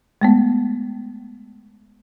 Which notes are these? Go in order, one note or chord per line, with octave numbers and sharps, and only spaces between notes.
G#3 A3 B3